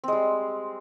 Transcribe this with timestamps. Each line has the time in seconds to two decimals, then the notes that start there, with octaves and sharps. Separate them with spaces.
0.04 C4
0.08 G#3
0.12 G3